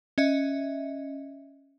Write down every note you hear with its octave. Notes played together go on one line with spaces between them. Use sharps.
C#4 D#5 E5